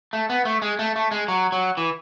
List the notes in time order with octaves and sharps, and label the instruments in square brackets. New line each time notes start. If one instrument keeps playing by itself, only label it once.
[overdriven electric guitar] A3
B3
A3
G#3
A3
A3
G#3
F#3
F#3
E3